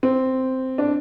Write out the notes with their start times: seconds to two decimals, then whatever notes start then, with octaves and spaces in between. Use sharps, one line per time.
0.03 C4
0.78 D4